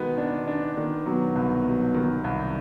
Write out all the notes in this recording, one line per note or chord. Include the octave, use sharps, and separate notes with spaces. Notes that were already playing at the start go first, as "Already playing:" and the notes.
Already playing: B2 D#3 G#3 B3
D4
D4
D#3
B2 F#3
C2
F#3
D#3
C2